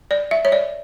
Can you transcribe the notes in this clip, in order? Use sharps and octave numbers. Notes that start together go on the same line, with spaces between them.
D5
E5
C#5
D5